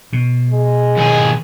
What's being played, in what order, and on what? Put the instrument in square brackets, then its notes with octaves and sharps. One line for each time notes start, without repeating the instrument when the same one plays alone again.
[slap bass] B2
[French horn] G#3
[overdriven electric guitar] D#2 G#4